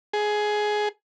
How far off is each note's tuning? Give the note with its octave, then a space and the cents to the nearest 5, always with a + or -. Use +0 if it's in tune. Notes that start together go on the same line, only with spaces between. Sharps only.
G#4 +15